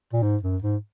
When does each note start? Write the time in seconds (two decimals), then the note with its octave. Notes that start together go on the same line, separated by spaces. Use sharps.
0.13 A#2
0.23 G#2
0.43 F#2
0.62 G#2